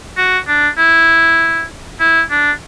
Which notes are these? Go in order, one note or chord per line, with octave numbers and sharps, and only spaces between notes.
F#4
D4
E4
E4
D4